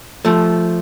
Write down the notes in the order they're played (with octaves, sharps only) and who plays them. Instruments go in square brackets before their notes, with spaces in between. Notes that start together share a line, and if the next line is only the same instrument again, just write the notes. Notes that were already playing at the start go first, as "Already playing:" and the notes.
[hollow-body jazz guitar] F3 A3